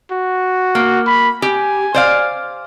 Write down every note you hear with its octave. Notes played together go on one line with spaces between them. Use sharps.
F#4
A#3
B5
G4 G#5
C5 D5 F5